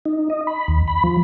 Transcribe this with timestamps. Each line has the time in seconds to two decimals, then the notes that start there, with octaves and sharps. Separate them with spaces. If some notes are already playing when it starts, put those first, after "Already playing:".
0.06 D#4
0.30 D#5
0.47 B5
0.68 D#2
0.88 B5
1.04 F3